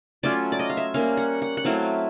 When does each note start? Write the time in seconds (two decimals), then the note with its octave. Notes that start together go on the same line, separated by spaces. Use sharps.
0.23 F#3 A3 C#4 F4 D5
0.52 D5
0.59 D#5
0.70 F5
0.77 E5
0.94 G3 A#3 C#4 F5
1.17 F#5
1.42 F#5
1.57 F#5
1.65 F#3 A3 C4 E4 F5